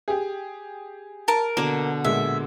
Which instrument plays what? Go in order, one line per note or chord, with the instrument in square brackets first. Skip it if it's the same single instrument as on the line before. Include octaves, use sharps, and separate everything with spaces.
[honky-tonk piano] G4 G#4
[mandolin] A#4 A5
[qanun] B2 D3 D6 [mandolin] A#3
[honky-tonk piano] A#2 G#3 [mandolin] E5